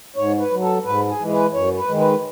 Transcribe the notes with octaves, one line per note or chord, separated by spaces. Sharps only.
G#2 C#5
B4
F#3
A4
G#2 B4
G#4
E3 G#3
B4
F#2 C#5
B4
D#3 G#3
B4